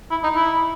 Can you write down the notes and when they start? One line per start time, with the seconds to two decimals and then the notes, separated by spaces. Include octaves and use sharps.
0.11 E4
0.24 D#4
0.35 E4